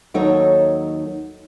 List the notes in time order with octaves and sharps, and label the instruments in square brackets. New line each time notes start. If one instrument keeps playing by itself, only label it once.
[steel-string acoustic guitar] D#2 F#3 D#4 A4 C#5